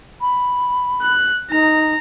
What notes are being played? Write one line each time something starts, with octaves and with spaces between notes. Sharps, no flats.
B5
F#6
D#4 A#5